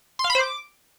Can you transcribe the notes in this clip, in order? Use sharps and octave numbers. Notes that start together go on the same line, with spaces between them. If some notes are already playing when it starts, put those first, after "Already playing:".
C6
F5
B5
C5
D6